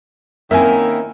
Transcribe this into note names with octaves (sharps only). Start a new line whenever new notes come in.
D#3 A#3 C4 C#4 E4 A#4 E5 G#5